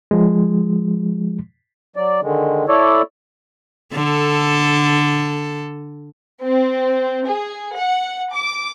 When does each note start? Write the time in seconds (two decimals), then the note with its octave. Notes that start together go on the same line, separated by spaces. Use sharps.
0.11 F3 G#3
1.96 F#3 D5
2.23 D3 D#3 G#3
2.68 E4 A4 C#5 D5
3.93 D3 A4
6.40 C4
7.25 G#4
7.74 F#5
8.30 D6